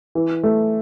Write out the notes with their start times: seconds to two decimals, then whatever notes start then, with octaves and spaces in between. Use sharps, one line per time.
0.15 E3
0.44 A3